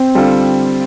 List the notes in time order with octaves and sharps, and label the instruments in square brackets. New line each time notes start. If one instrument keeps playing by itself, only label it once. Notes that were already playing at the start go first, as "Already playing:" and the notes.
Already playing: [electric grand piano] C4
[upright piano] D3 G3 F4 A4